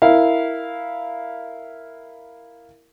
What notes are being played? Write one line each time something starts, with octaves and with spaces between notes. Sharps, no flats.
E4 A#4 F5